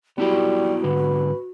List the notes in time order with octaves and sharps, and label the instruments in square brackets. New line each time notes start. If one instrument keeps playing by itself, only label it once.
[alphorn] G3 [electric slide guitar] B3 E4 G4 [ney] F#4
[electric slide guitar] G#2 D3 [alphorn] B4